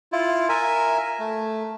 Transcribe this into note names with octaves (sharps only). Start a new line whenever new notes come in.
E4 F4
A#4 E5 G#5
A3